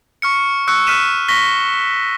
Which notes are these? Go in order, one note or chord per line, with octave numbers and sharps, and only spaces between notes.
C#6 F6 C#7
C#6 E6 F#6 C#7
F6 F#6 B6 D#7 E7
C#6 A#6 B6 G7